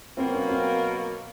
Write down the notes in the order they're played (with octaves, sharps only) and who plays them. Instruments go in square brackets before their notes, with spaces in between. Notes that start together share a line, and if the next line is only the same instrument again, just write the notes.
[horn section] B2 F#3 A#3 [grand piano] C4
[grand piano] C#4
C4